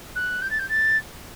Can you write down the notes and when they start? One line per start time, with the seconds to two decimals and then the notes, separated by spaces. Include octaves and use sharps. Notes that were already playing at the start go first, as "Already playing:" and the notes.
0.15 F#6
0.41 G6
0.50 A6
0.59 G6
0.68 A6